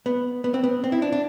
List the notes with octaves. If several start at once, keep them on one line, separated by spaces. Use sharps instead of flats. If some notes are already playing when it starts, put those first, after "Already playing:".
B3
B3
C4
B3
C4
E4
D4
D4